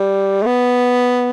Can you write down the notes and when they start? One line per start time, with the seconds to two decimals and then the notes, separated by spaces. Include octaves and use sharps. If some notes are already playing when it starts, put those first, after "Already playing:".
Already playing: G3
0.42 A3
0.46 B3